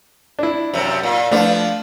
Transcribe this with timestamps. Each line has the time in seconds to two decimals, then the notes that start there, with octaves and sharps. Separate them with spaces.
0.39 D4 E4
0.74 F#2 C3
1.03 A#2
1.31 F3 A3 B3 D4